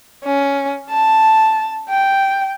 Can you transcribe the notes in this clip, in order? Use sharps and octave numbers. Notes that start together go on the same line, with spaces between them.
C#4
A5
G5